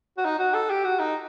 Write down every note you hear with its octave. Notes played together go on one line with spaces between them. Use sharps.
F#4
D#4
F#4
A4
G4
F#4
D#4